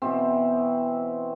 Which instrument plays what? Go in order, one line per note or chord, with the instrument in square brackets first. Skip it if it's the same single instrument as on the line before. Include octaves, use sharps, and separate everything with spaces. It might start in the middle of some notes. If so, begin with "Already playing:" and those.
[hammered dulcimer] B2 E3 C4